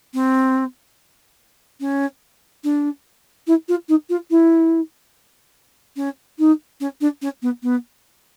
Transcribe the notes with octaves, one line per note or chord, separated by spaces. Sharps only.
C4
C#4
D4
E4
F4
D#4
F4
E4
C#4
D#4
C#4
D4
C#4
B3
B3